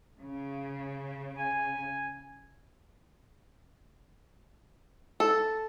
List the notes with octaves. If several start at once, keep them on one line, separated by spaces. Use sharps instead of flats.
C#3
G#5
A4